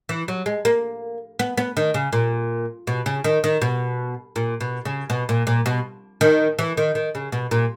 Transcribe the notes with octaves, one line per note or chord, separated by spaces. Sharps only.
E3
F#3
G#3
A#3
B3
B3
D#3
C#3
A#2
B2
C#3
D#3
D#3
B2
A#2
B2
C#3
B2
A#2
A#2
B2
D#3
E3
D#3
D#3
C#3
B2
A#2